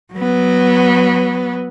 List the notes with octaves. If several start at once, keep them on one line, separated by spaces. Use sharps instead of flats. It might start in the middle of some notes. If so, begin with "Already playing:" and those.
F#3 B3